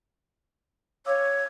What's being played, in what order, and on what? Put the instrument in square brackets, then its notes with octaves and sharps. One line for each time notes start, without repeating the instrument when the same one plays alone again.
[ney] C#5 [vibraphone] F5 D6 E6